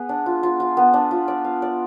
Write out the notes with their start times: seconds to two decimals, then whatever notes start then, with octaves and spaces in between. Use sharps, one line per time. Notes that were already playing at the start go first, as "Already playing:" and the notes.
Already playing: B3 G#4
0.09 D4
0.26 F4
0.43 F4
0.60 F4
0.77 B3
0.94 D4
1.11 F4
1.28 D5
1.45 F5
1.62 D5